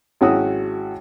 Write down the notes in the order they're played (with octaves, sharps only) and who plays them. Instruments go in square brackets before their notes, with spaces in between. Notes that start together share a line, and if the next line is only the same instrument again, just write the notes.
[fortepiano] G#1 F#3 C#4 E4 F#4 D#6